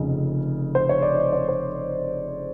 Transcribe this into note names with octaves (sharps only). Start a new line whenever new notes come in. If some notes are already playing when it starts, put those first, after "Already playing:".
Already playing: F1 F2 C#3
C5
C#5
D5
D#5
C#5
C5